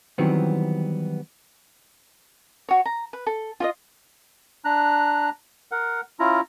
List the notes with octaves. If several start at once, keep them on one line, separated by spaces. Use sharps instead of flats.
D#3 E3 F#3 G3 B3 C4
F#4 C#5
A#5
B4
A4
F4 D5 D#5
D4 A#5 F#6
A#4 F#5
C#4 E4 F4 A#5